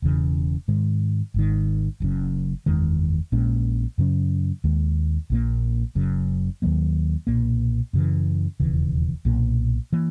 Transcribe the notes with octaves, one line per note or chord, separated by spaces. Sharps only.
E1 E2 C#3 E3
G#2 D#3 G#3
G#1 G#2 D#3
F#1 F#2 C#3
F#1 E2 D#3 G#3
A#1 A#2 G#3 C#4
F#2 C#3 F#3 C#4
D#2 D#3 G#3
A#1 A#2 A#3
F#1 F#2 C#3
D#2 D#3 F#3 A#3
B1 A#2 A#3
F#2 C#3 E3
E1 D#2 C#3 E3
B1 A#2 A#3
E3 A#3